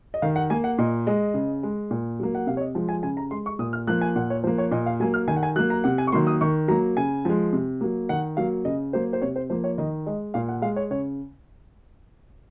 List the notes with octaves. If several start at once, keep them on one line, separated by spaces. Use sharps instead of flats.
D#5
D#3 F5
F#5
A#3 G#5
F#5
A#2 D#5
G#3 D#5
C#3
G#3
A#2
F#3 A#3
F#5
C3 F5
C#5
D#5
F3 G#3
G#5
C#3 G#5
A#5
G#3 C6
C#6
A#2 D#6
F6
F3 A#3 F#6
G#5
A#2 F#5
C#5
F3 A#3 C5
C#5
A#2 D#5
F5
F#3 A#3 G#5
F6
D#3 G#5
F#5
G#5
F#3 A#3 F#6
A#5
C3 F#5
G#5
C#6
D#3 F#3 A#3 C6
D#6
D#3 C#6
F#3 A#3 A#5
C#3 G#5
F3 G#3
C3
F#3 A#3
D#3 F#5
F#3 A#3 F5
C#3 D#5
F#3 A#3 C5
C5
C3 C#5
C5
F3 A#3 C5
C#5
D#3 D#5
G#3 D#5
A#2 F5
F#5
G#3 F5
C#5
C#3 C#5